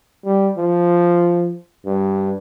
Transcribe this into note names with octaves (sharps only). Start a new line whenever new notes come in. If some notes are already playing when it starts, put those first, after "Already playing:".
G3
F3
G2